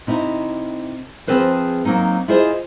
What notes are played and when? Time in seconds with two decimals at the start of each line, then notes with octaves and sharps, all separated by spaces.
0.07 C3 D#4 E4
1.27 F3 B3 C4 G#4 B4 C5
1.85 F#3 A#3 C4 D#4
2.28 E4 F4 G#4 C5 D#5